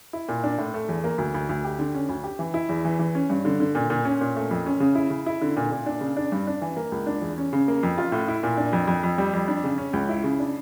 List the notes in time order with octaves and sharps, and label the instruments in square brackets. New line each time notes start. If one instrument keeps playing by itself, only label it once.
[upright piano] E4
A#2
D4
A2
A3
E2
A#3
D2
D2
D2
G4
D3
C#4
D2
G4
E3
E4
E2
E3
E3
C#4
G2
D3
D3
A#2
A#2
C#4
A#2
A3
F2
C#4
C#3
E4
C#3
E4
D3
A#2
A#2
D4
C#3
D4
G2
D4
E3
A#3
C#2
D4
E2
C#4
C#3
A#3
F2
F4
A2
E4
A#2
D4
F2
F2
F2
G3
F2
D4
C#3
C#4
C#2
E4
C#3
D4